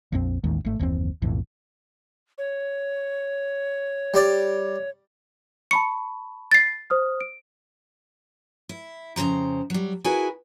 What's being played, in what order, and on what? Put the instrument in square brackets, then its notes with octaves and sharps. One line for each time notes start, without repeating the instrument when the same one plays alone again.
[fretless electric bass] A#1 F2 C4
A1 D#2 D#3 G#3
G#1 A3
F#1 D#2 E3 C4
B1 F2 A2 E3
[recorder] C#5
[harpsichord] G3 D5
[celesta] A5 B5 C#6 [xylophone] C#7
[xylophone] A6 C7
[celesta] C5 D#6 F6
D7
[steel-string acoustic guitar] E4
F2 C#3 F3 C5 A#5
F#3 G3
E4 F#4 G#4 A#4 B4 G#5